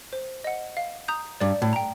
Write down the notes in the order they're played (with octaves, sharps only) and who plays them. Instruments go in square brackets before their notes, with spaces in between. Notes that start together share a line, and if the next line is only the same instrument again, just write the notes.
[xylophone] C5
D#5 F#5
F5
A#5 D#6 G6
[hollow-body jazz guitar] G2 [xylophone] D5
[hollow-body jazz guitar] A2
[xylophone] G5 A#5